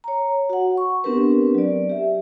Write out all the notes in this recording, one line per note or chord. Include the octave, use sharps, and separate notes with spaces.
C#5 A#5
F#4 F#5
C#6
B3 C4 D4 G4 A#4 B4
F#3 D5
G4 E5